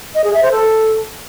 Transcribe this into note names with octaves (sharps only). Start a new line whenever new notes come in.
D#5
G#4
E5
C5
A4